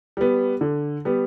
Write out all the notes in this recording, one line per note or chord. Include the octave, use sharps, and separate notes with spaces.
G3 B3
D3
G3 B3